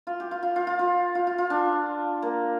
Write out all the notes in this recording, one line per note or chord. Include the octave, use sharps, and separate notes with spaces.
F4
G4
F4
F4
F4
F4
F4
F4
F4
F4
D4
A#3